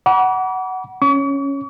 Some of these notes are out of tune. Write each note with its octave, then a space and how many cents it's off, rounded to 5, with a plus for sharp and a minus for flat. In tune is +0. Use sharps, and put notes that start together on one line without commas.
F#5 +15 B5 -45 D6 -40
C#4 +0 C#6 +40